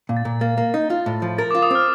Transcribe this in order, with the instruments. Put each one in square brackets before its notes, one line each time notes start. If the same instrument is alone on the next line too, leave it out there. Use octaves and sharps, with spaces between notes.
[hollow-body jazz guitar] A#2
[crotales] A6
[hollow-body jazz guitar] A#2
[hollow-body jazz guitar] A#3 [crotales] A6
[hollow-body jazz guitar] A#3
D#4
F4
A2
F3
[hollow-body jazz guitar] A#4 [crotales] A6
[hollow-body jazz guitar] F4 [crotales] D6
[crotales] D#6
[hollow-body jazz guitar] C4 [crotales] F6